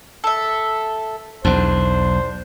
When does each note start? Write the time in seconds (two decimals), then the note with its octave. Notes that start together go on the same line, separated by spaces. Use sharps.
0.24 A4 E5
1.45 B1 E2 D4 C5